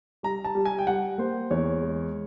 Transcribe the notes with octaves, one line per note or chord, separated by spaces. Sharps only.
G3 A#5
A5
G3
G#5
G5
G3 F#5
A#3 C5
E2 C#5
G#3